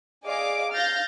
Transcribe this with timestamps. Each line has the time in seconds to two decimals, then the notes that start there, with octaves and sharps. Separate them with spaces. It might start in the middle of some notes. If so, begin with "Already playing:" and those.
0.24 G#4 D5 D#5 F5 D6
0.72 F5 F6 G6 A6 A#6